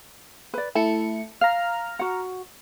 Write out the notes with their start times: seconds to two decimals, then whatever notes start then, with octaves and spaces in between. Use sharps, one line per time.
0.54 B4 D5
0.75 A3 E4 A5 C#7
1.41 F5 A#5 F6
1.99 F#4 F#5